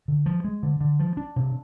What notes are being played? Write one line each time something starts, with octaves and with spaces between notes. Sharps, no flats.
D3
F3
G#3
D3
D3
F3
D4
C3